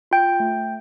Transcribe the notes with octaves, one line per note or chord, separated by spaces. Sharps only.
F4 G5 G6
A3